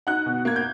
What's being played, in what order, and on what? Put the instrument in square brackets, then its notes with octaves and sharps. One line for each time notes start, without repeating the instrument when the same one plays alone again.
[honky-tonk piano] D#4 F#5 F#6
B2
A#3 G#6
G6